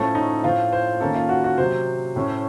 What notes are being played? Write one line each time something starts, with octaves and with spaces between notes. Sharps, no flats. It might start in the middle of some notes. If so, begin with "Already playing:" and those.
Already playing: A2 F3 A3 C#4 A4
D#4
A2 F3 C4 F4
C5
D#3 A#3 C#4 A4
F4
F#4
F#4
C3 F#3 C4 C5
A2 A3 C#4